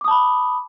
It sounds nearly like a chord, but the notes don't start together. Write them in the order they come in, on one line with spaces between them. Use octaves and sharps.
D6 D#6 A5 B5